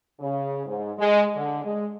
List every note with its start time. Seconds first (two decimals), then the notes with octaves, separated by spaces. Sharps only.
0.20 C#3
0.66 G#2
0.98 G#3
1.35 D3
1.64 G#3